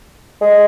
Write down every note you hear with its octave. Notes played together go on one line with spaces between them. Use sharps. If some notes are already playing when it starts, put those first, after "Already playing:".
G#3